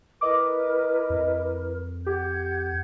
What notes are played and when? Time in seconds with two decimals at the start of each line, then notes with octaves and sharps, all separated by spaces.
0.21 E4 A#4 B4 D#5 D6
1.10 F2
2.06 G4 F#5 G6 G#6